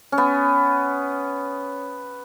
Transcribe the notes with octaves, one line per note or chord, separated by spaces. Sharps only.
C#4
B3